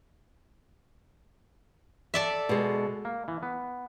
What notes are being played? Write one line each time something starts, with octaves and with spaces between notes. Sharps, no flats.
A4 D5 E5
B2 G#3
A#3
E3
B3